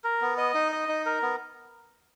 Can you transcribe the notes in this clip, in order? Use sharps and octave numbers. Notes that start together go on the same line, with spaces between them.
A#4
B3
D#5
D#4
D#5
D#4
A#4
B3